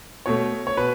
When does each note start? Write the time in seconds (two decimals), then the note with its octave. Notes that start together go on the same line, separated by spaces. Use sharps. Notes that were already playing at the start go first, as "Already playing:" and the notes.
0.26 B2 A3 C#5
0.67 C#5
0.77 B2 B4